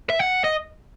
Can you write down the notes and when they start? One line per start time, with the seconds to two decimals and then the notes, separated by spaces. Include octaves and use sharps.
0.10 E5
0.19 F#5
0.44 D#5